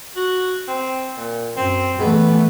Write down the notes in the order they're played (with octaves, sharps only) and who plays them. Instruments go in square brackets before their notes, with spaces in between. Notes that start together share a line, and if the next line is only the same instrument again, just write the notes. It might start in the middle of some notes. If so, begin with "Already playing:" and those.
[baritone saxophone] F#4
C4
A#2
[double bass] F#2 [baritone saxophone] C4
[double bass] E3 A3 [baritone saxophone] B3